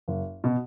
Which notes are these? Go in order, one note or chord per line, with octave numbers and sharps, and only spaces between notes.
F#1
B2